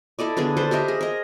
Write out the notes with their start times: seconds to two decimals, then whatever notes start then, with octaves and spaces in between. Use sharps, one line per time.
0.19 E4 A4 D5 D#5
0.37 D3 B3 D4 G#4
0.57 A4 B4 C5
0.71 G4 A#4 D#5 E5
0.88 G#4
1.01 A#4 D#5